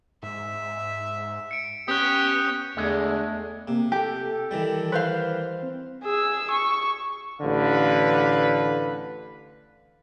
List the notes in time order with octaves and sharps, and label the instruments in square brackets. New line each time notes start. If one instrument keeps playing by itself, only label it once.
[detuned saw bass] G#2 [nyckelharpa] E5
[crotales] C#7 D7
[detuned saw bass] B3 [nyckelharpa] C#4 G5 [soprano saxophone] G4 [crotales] D#6 F#6
[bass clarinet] E2 [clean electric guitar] D3 G#3 [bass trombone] A3
[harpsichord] C3 [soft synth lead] A#3
[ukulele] G4 [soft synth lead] A4
[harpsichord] D#3 E3 G3
[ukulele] B4 C5 F5
[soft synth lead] C4
[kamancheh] G#4 E6
C#6
[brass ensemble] A1 D3 B4 F5